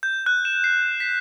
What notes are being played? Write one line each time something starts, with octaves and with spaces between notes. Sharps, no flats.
G6
F#6
E7
C7
B6